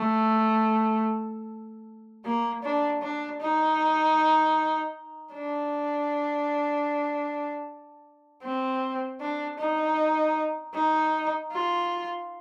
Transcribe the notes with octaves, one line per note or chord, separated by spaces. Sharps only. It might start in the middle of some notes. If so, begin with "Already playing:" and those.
Already playing: A3
A#3
D4
D4
D#4
D4
C4
D4
D#4
D#4
F4